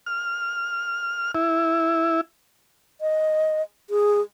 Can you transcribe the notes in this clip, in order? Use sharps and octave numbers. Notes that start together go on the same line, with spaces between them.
F6
E4
D#5
G#4